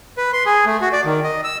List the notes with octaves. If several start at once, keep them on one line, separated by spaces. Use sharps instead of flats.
B4
C6
G#4
A3
F#4
D5
D#3
D#5
E6